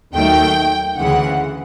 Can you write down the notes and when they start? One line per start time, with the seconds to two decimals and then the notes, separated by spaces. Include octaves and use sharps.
0.14 D#2 D#3 F#3 A3 G5
0.97 D2 C#3 E3 G#3 F#5